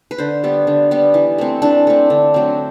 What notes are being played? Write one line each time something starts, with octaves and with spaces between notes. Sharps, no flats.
B4
D3 C5
G3 B3
D3
G3 B3
E3
A3 C4
E3 D4
A3 C4
D3
F#3 A3 C4